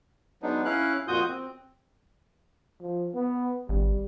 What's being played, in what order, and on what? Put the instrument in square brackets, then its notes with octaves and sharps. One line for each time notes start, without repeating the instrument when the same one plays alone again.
[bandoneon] F#3 G#3 B3 D4 D#4
C#4 E4 F5 F#6
F2 A#2 F4 F#4 D#6 G6
C4
[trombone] F3
B3
[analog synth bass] G#1 [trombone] G3